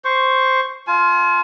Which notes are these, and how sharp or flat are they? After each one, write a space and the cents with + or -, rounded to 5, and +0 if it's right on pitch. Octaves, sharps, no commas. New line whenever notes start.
C5 +0 C#6 +0
F4 +0 G#5 +45